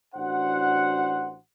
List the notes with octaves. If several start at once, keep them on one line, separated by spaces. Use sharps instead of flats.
A1 D4 F#4 C5 F#5